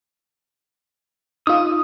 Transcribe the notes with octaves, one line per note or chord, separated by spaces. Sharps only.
D#4 F4 D#6